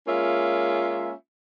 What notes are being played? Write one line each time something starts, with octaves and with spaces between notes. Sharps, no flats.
G#3 A#3 C#4 F4 E5